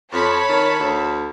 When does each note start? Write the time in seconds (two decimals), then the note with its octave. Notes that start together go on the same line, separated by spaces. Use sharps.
0.12 F2 C#5 A5 B5
0.49 D#3
0.79 D2